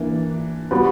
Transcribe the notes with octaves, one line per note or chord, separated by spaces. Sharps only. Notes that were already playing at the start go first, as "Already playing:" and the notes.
Already playing: E3 A#3 D4
G3 B3 F#4 B4